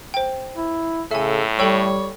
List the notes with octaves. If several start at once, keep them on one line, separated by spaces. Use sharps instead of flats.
C5 G5
E4
A2 C#3 A4 E5 G#5
G3 A4 C#5 G5 E6